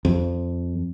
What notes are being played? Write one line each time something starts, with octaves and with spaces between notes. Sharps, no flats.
F2